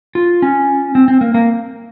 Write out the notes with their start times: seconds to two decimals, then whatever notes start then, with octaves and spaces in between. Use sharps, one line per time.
0.15 F4
0.42 C#4
0.95 C4
1.08 C4
1.21 A#3
1.34 A#3